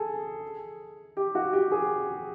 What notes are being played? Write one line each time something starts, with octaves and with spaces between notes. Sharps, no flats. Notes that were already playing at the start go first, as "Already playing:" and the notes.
Already playing: G#4 A4
G4
F#4
G4
G#4